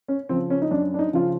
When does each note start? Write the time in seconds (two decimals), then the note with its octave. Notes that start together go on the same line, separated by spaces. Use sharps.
0.08 C#4
0.29 C#3 F3 C4
0.50 C#4
0.62 D#4
0.71 F#2 D4
0.94 D4
0.99 D#4
1.13 C#3 F3 F4